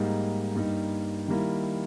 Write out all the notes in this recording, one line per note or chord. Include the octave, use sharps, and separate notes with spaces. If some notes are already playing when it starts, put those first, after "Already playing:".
Already playing: G#2 G3 A#3 D#4
G2 G3 A#3 D#4
D#3 G3 A#3 E4